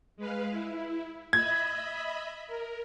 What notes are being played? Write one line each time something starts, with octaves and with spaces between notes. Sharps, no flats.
G#3 B4 F5
E4
D#5 E5 B5 G#6
A#4